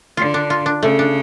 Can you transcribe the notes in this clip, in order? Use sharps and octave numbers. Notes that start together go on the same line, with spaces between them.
D3 F4
D4
F4
D4
C#3 A3
D4